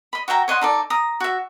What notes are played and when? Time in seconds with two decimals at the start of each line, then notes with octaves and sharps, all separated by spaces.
0.13 D#5 B5
0.28 F#4 E5 G5 A#5
0.48 C#5 D#5 F#5 C6
0.61 D#4 A4 D5
0.90 A#5 D#6
1.20 F#4 E5